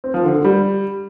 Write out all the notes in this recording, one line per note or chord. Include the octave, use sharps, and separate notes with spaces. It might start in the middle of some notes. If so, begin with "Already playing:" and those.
C4
F3
D3
D3
G3